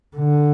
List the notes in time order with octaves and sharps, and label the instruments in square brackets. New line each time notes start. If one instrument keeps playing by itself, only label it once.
[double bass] D3